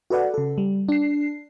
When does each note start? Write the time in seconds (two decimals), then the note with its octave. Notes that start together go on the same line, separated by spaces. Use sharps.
0.10 F#4 A4 B4 D5 F#5
0.34 C#3 A4
0.58 G3
0.89 D4 C7